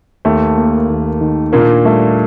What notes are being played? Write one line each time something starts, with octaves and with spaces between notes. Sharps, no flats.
D#2 A3
A#3
D#2
D#3
A#2 A#3 D4
G3 A3